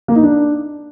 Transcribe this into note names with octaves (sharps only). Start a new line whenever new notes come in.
A#3
D#4
D4